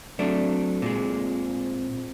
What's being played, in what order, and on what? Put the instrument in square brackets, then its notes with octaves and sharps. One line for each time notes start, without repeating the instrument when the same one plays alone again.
[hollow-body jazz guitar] F#3 A3 D4 [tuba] C4
[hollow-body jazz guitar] A#2 G#3